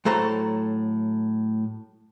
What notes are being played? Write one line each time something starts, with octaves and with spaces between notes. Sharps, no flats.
A2 F#3 A4 C5 A#5